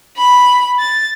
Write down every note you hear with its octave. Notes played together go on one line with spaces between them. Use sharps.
B5
A6